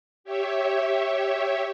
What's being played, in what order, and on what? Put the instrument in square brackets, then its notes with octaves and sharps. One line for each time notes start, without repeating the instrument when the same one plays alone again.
[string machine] G4 C#5 E5